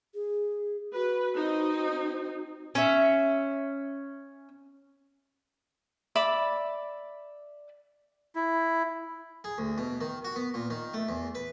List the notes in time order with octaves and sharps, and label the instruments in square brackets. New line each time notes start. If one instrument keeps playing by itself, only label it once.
[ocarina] G#4
[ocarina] F#4 [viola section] B4
[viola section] C4 D#4
[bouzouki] C#4 E5
[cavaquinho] D5 E5 B5 D6
[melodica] E4
[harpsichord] G#4
D2
B2
D#3
F#4
B3
A#2
D#3
A3
E2
B4